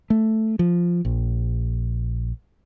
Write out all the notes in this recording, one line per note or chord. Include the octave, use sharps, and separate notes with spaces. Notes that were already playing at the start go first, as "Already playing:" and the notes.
A3
F3
A#1